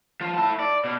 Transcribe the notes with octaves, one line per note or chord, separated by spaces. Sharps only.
F3 F4
E4 A5
D5
B2